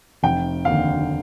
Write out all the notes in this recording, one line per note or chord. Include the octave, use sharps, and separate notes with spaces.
F1 G5
D#2 D3 F5